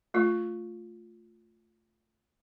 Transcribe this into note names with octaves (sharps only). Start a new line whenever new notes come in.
A3 F4